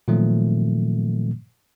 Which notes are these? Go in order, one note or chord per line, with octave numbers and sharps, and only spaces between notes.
A#2 D#3 F3 F#3 A3 C4